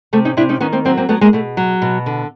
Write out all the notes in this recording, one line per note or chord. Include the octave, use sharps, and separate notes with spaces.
C3 A3
C#4 D#4
C3 D4 E4
C#4 D#4
D#3 B3 C#4
A#3 C4
F#3 A#3 C4
A#3 C4
F#3 A3 B3
G#3 A#3
B2 A3
F#3
B2
D3